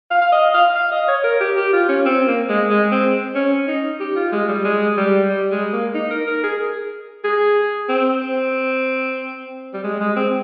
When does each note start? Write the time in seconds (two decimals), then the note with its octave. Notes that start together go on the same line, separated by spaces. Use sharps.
0.11 F5
0.22 F5
0.32 D#5
0.54 F5
0.75 F5
0.91 D#5
1.08 C#5
1.24 A#4
1.41 G4
1.57 G4
1.73 F4
1.89 C#4
2.05 C4
2.27 A#3
2.49 G#3
2.70 G#3
2.91 C4
3.35 C#4
3.68 D#4
4.00 G4
4.16 F4
4.32 G#3
4.49 G3
4.65 G#3
4.97 G3
5.30 G3
5.51 G#3
5.73 A#3
5.94 D#4
6.11 A#4
6.27 A#4
6.44 G#4
7.24 G#4
7.89 C4
8.22 C4
9.74 G3
9.84 G#3
10.00 G#3
10.16 C4